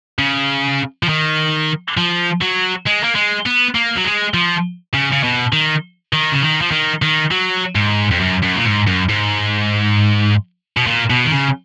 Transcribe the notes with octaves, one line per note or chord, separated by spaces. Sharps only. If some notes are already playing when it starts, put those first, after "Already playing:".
C#3
F3
D#3
F3
F#3
G#3
A#3
G#3
B3
A#3
F#3
G#3
F3
C#3
C#3
B2
D#3
D#3
C#3
D#3
F3
D#3
D#3
F#3
G#2
F2
F#2
F#2
A#2
G#2
F#2
G#2
B2
A#2
B2
D#3
C#3